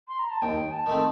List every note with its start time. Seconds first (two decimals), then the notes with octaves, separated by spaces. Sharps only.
0.08 C6
0.19 A#5
0.31 A5
0.42 D#2 G5
0.72 A5
0.86 D#3 A3 C4